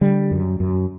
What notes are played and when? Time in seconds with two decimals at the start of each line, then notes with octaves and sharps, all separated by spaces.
0.01 D3 G3
0.31 F#2
0.60 F#2